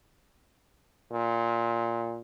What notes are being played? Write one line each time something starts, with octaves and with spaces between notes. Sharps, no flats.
A#2